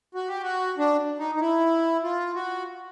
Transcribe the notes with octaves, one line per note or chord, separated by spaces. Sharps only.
F#4
G4
F#4
D4
D#4
D#4
E4
F4
F#4